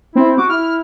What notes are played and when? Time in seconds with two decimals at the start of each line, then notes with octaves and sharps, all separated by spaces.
0.15 C4 E4
0.38 F#4 D6
0.49 E4 F6